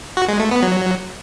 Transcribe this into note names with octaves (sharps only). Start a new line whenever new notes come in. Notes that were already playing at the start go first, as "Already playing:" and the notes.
F#4
G#3
A3
B3
F#3